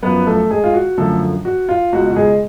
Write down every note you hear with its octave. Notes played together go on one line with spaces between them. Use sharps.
F#2 F3 B3 B4
A3 A4
G#3 G#4
F4
F#4
F#2 D3 F3 A3 A4
F#4
F4
C#2 B2 F#4
F#4
G#3 G#4